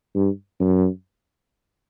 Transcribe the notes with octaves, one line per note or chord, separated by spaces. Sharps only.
G2
F#2